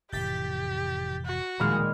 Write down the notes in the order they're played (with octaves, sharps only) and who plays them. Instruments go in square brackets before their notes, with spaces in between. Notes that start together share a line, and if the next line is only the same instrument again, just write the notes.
[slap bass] F1 A2 E3 [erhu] G4 [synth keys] G6 A6 B6
[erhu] F#4
[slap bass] D1 F3 G3 [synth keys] A#2 D#3 G#3 [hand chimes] B5 F6